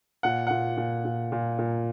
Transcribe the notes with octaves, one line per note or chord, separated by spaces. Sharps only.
A#2 F#5
A#2 F#5
A#2
A#2
A#2
A#2